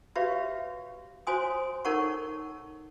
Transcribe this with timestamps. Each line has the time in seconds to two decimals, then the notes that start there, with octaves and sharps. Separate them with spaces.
0.16 F#4 G4 B4 C#5 E5 F5
1.27 F#4 C5 C#5 G#5 C6 D#6
1.85 D#4 A4 A#4 C#5 F#5 C#6